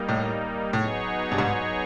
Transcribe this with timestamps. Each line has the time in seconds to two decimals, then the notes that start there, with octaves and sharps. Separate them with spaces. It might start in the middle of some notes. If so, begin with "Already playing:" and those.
Already playing: G3 A#3 D#4
0.08 A2
0.73 A2 F#3 B3 D#4 G#4 C#5
1.32 G2
1.38 G#2